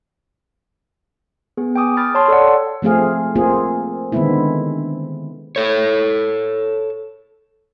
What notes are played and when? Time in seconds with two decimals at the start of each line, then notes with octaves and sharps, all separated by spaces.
1.57 B3 G#4
1.76 G5 G#5 D6 D#6
1.97 G5 B5 F6 A6
2.15 C#5 A5 C6
2.28 A4 D5 F#5
2.82 F3 A3 C4 G#4 F5
3.36 A#3 C4 F4 G#4
4.12 D3 D#3 G#3 B3 C4 E4
5.56 A4 C#5